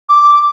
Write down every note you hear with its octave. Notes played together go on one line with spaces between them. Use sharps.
D6